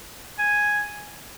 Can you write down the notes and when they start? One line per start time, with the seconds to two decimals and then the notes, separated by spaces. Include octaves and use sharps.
0.39 G#5